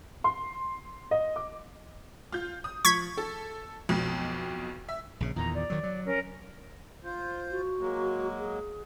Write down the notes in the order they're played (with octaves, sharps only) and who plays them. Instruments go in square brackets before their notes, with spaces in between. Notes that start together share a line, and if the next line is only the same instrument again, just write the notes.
[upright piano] C6
D#5
D6
[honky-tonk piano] F4 G6
D#6
[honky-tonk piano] F3 [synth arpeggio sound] C#6 G#6 B6
[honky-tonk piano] A4
B1 F2 B2
E5
[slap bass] A#1 C#3
[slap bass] E2 A#2 D#3 [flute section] A#5
[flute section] D5
[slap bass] D#3 F#3
F#3
[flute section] C#4 A#4
[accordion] F4 C5
[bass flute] F#4
[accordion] F#3 G#3 A#3
[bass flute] G#4